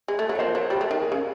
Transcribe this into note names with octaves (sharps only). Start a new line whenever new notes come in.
G#3
A3
F#3
C#5
F3 A#4 C5
F#3
G3
A3
D#3
G#4 A#4
C#3